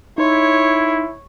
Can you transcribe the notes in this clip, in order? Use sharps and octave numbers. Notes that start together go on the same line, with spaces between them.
D#4 E4 C#5 C6